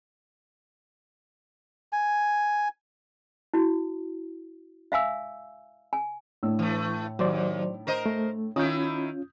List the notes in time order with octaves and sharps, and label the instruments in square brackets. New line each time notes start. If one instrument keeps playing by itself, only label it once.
[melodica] G#5
[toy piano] E4 F#4
E5 F5 G#5 E6
G#5
[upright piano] A2 D4 E6
[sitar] E3 A3
[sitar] D#2 [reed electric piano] F#3 C5 D5
[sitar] A#4 C5 D#5
[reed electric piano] A3
[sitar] D#3 E4 [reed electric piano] C#4 F4 [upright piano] D#6 G6